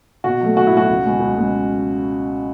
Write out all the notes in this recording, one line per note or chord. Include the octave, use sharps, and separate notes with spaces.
B2 F#4
F#3 A3
B2 F#4
E4
F#3 A3 F#4
C#2
B2 G#3 C#4
C#2
B2 G#3